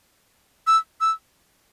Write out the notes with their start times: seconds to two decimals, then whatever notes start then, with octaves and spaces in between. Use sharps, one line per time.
0.67 E6
1.01 E6